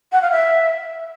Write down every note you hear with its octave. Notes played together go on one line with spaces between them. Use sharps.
F#5
F5
E5